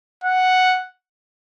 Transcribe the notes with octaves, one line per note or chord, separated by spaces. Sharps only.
F#5